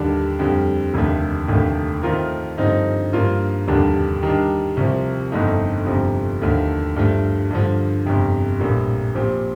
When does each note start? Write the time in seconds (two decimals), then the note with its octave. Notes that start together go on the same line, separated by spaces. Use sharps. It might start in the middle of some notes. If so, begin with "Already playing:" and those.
Already playing: D#2 D3 G3 D4
0.39 F2 D3 G3
0.94 F1 D#2 D3 A3
1.48 F1 D#2 D3 A3
2.03 D#3 A3 C4 F4 A#4
2.58 G2 D3 F3 C4 D#4
3.13 G2 F3 A#3 F4
3.68 F1 D#2 D3 G3 D4
4.23 D#3 G3 D4
4.77 C2 C3 F3
5.32 G1 F2 D3 A3 D#4
5.86 G1 F2 C3 F3
6.41 D#2 D3 F3 A3
6.96 G2 F3 A3
7.51 G2 D3 F3
8.06 G1 F2 C3
8.60 A#1 A2 G3 A#3
9.15 A#2 F3 C4 G4